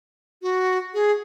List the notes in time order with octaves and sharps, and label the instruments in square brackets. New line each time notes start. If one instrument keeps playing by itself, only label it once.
[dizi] F#4
G#4